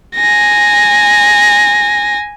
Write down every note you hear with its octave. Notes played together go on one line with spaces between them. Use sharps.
G#5 A#6